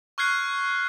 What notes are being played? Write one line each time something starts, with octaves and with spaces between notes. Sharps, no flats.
C#6 F6 F#6 G#6 C7